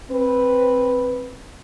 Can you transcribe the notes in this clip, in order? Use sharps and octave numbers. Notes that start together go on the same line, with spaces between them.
C4 B4